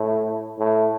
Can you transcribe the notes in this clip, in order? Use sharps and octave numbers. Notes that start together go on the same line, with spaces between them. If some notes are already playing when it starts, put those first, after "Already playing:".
Already playing: A2
A2